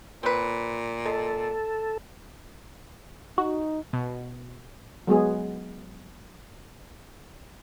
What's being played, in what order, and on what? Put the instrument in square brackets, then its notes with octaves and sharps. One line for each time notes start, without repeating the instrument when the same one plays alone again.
[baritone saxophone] A#2 [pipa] C4 B4
[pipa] G#3 [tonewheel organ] A4
[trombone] D#4 [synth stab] F#4
[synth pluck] B2
[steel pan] F#3 G#3 B3 G#4